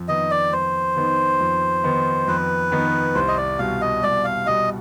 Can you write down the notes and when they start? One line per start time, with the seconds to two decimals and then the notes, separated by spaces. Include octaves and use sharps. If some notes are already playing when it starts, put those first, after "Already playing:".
Already playing: F2
0.08 D#3 B3 D#4 D#5
0.31 D5
0.52 F2 C5
0.96 D#3 B3 D#4
1.40 F2
1.84 D#3 B3 D#4
2.28 F2 B4
2.72 D#3 B3 D#4
3.15 C2 C5
3.28 D#5
3.37 D5
3.58 B2 G3 F5
3.81 D#5
4.03 C2 D5
4.24 F5
4.47 B2 G3 D#5